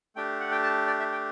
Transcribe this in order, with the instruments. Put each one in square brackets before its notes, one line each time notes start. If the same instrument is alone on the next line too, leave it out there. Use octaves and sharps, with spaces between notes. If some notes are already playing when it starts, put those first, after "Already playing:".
[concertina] A3 D4 G4 G5
F#5
G5
A5
D5
E5
G5